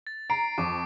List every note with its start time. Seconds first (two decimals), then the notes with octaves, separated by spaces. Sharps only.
0.07 A6
0.30 A#5 C7 D7
0.58 F2 C#6 D6